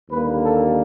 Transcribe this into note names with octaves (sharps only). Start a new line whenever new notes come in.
D#2 D3 G3 A#3 B4
A4